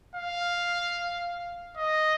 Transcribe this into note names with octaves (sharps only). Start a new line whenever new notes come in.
F5
D#5